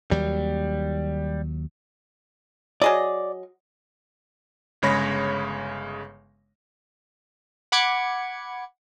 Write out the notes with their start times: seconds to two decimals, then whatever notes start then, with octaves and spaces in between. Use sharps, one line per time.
0.11 D#2 F#3 G3
2.82 F#3 G#4 D5 D#5
4.82 G1 C#3 G#3 C#5 B5 A#6
7.72 F#5 B5 D6 G#6 C#7